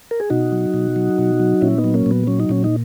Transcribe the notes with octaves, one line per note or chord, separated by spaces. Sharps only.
A#4
G#4
B2 D#4 F#4
F#3
B2
F#3
B2
F#3
A#2 C#4 E4
B3 D#4
F#3
A#3 C#4
A#2 B3
F#3 C#4
D#4
A#2 C#4
D#4